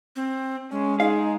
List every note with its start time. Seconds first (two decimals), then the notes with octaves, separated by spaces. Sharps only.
0.16 C4
0.71 G#3 C#4
1.00 G#3 D#4 G#4 F5